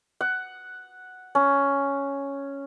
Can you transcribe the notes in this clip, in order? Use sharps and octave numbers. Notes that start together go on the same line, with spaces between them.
F#5
C#4